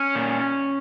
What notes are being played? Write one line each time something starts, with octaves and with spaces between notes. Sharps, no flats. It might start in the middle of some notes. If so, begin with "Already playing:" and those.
Already playing: C#4
A#2